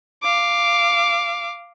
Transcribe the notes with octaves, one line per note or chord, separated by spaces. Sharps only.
F5 D6